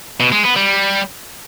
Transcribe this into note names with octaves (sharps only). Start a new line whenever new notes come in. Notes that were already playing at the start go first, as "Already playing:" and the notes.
B2
G#3
B3
G3